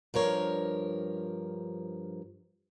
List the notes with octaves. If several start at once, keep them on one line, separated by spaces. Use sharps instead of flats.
G2 F3 A#4 C#5